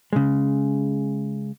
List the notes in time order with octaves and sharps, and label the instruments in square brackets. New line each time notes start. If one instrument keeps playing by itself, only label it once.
[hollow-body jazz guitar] C#3 G#3